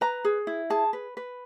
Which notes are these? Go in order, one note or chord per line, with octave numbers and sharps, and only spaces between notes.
B4 A#5
G#4
E4
G#4 A5
B4
B4